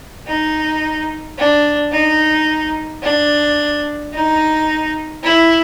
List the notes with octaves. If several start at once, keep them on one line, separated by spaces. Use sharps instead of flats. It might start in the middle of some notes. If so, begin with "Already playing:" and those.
D#4
D4
D#4
D4
D#4
E4